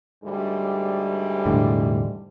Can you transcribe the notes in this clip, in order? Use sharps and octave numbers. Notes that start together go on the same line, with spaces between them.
D2 G#2 G3
E1 A2 D3